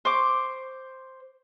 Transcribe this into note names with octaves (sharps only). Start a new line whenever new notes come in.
C5 C#6 D6